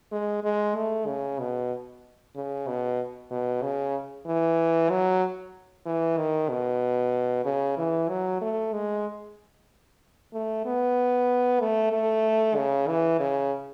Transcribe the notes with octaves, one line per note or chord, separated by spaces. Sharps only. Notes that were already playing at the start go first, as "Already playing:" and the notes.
G#3
G#3
A3
C#3
B2
C#3
B2
B2
C#3
E3
F#3
E3
D#3
B2
C#3
E3
F#3
A3
G#3
A3
B3
A3
A3
C#3
E3
C#3